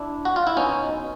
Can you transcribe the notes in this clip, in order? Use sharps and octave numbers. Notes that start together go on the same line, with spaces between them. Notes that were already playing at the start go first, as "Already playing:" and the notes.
Already playing: D4 E4
F#4
F4
E4
B2 C#4 D#4